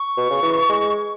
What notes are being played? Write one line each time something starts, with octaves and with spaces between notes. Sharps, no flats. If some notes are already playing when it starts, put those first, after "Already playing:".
Already playing: C#6
B2
C#3
E3
G#3